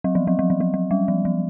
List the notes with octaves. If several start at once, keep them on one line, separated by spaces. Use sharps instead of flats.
F#3
F3
F#3
F#3
F3
F#3
F#3
G3
F3
F3